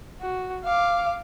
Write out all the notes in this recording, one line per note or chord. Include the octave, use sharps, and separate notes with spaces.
F#4
F5 D6